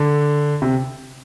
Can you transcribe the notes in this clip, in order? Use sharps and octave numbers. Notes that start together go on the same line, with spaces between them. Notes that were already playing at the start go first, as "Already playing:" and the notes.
Already playing: D3
C3